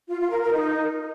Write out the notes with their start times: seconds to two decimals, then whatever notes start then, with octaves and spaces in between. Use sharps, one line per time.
0.09 F4
0.20 F4
0.30 A#4
0.41 A#4
0.52 D#4